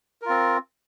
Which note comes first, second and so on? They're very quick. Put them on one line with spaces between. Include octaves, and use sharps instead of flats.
A#4 F4 C4